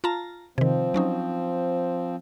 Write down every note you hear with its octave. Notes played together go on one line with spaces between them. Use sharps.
F4 A5 A#5
C3 D#3 F3 C4
F#3 C#4 D#4